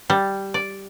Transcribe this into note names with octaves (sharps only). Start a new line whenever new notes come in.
G3
D5